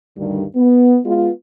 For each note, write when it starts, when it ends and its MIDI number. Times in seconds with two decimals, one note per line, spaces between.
0.17 0.43 38
0.17 0.43 43
0.17 0.43 50
0.17 0.43 51
0.17 0.43 55
0.56 0.99 59
1.05 1.30 56
1.05 1.30 59
1.05 1.30 65